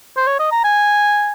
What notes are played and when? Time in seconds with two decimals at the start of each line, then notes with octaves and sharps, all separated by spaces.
0.17 C5
0.27 C#5
0.39 D#5
0.52 A#5
0.64 G#5